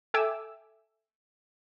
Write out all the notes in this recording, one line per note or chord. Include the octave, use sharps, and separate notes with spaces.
A4 E5 G5 G#5 D6 E6